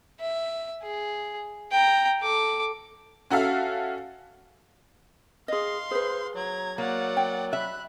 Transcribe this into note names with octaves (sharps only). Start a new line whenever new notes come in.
E5
G#4
G5 A#5
A4 D6
C#4 F#4 A4 E5 F5
G#4 D#5 F5 C6
G#4 B4 C5
F#3 A#5 G#6
F#3 A#3 D5 F#5
G5
E5 B5 F#6